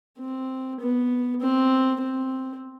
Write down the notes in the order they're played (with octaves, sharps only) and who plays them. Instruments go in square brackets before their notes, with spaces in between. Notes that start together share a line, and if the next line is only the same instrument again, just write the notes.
[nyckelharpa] C4
B3
C4
C4